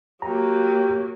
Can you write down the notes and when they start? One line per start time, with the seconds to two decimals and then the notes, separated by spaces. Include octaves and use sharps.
0.22 F#3 A#3 G4 A#5